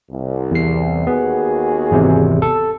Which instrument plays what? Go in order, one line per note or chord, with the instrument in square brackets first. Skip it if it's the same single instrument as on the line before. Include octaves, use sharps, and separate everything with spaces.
[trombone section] C2
[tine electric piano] E2 C7
[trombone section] D#2 F#4 G#4 [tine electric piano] B3
[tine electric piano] G#1 E2 C3
A4